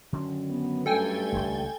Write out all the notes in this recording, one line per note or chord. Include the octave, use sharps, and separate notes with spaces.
F#2 D3 D#3 C#4
B3
G2 G3 A3 A4 G5 G#5
D#1 G#1 C#2